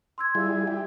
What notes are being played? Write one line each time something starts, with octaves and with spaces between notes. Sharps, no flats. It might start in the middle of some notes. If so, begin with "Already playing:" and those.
C6 E6 G#6
G3 E4 F4 G#4 D5 F5
E4 G4